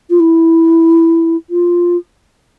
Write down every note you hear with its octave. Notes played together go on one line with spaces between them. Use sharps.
F4
E4
F4